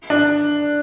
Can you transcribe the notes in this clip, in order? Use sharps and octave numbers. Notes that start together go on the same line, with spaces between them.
D4